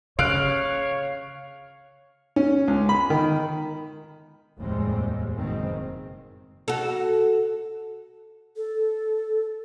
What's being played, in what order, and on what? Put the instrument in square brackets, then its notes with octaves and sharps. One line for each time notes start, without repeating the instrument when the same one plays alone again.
[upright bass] C#3 [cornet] C#5 [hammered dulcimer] F5 [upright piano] F#6 D7
[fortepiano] C#4
C#2
B5
D#3
[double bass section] F1 D#2 A2 G3 G#3 C4
F#1 B2 D#3 G#3 C4
[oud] F#4 A4
[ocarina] A4